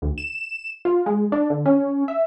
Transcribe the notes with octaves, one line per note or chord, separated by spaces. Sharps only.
D2
E7
F4
G#3
D4
D3
C#4
E5